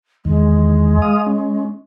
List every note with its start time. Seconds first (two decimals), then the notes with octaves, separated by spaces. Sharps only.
0.25 E2 D#3 G#3
1.02 F5 D#6
1.27 C#4